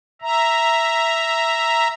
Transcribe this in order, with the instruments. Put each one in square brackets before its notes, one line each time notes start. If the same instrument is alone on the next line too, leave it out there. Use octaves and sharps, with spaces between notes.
[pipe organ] E5 A#5